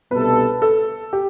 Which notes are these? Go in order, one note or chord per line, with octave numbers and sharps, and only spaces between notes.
C2 B2 A3 D4 A4 B4
A4
G4